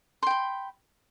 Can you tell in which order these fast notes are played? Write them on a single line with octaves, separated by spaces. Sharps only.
C6 G5 B5